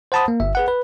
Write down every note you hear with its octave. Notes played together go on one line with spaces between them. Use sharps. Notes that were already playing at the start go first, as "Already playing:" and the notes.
C5 F#5 A5 B5 D#6
A#3
G1 E5
G#4 B4 F#5
B4